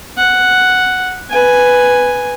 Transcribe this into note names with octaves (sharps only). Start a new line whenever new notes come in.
F#5
B4 G#5